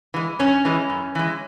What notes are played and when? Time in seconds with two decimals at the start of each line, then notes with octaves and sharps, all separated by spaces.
0.14 E3 G#3
0.39 F#2 C#4
0.65 E3 G#3
0.90 F#2
1.15 E3 G#3